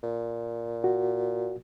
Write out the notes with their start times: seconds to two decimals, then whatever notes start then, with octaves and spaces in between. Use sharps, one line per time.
0.03 A#2
0.84 F#4